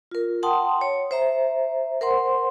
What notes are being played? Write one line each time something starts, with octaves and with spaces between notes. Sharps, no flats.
F4 A#4
F#5 G5 A5 C6 D#6
C#5
C5 E5 A#5
A#4 C5 F#5 C6